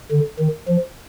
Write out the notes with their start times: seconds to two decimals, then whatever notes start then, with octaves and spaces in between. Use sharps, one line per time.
0.11 D3
0.39 D#3
0.68 F3